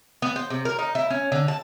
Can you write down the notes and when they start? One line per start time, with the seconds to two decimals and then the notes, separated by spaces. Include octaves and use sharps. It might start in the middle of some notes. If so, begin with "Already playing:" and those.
0.22 B3
0.36 C5
0.50 C3
0.65 A#4
0.79 D#4
0.95 E4
1.10 C#4
1.32 D3
1.48 A5